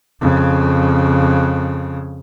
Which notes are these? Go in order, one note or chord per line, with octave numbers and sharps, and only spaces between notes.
F2 C#3